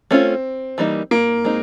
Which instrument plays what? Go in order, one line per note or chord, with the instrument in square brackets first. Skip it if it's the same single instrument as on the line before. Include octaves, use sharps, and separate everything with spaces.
[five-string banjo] A3 C#4 F4 [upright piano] C4
[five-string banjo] E3 G3 A#3 D#4
[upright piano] A#3
[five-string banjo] G#3 C4 D#4